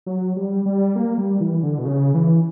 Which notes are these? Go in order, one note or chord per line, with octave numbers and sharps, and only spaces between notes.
F#3
G3
G3
A#3
G3
E3
D3
B2
C#3
E3